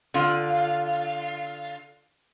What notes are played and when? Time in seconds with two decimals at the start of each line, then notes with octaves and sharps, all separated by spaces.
0.14 D3 F4